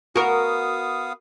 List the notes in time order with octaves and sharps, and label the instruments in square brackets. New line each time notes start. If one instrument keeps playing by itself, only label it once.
[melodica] B3 F5 D#6 [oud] F#4 A#4